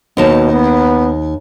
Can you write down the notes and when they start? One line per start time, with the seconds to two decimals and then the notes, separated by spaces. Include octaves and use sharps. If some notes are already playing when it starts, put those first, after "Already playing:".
0.17 D#2 B2 D#4 A5
0.53 B3